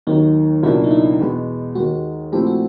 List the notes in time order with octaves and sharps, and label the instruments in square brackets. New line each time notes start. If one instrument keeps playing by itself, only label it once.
[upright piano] D#2 D#3 F#3 A#3 [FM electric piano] D#4
[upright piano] C#2 B2 F#3 A#3 D4 [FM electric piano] E4
[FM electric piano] D#4
E4
[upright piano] E2 B2 G#3 B3
[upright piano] D#2 D#3 G#3 [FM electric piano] F#4
[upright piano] A#2 F3 A3 C4 E4 [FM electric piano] G4
[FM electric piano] F#4